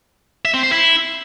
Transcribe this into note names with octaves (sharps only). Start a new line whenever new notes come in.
E5
C4
C5
E4